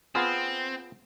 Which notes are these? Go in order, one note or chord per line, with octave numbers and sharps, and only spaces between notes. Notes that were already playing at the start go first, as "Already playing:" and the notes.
B3 C4 F4 G#4